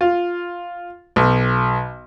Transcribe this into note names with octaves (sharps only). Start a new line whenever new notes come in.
F4
B1